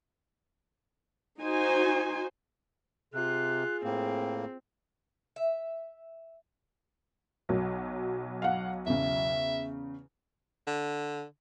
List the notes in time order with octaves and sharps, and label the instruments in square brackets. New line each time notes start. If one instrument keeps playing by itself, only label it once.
[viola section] D#4 F#4 C5 G#5
[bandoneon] C3 [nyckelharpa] F4 [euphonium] G#4 [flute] F#6
[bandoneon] A2 A#3 [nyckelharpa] C4 [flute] G5
[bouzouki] E5
[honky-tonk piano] B1 F#3
[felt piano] F5 F#5
[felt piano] E2 C#3 [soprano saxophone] E5
[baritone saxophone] D3